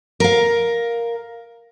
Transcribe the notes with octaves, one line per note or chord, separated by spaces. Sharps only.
A#4 F5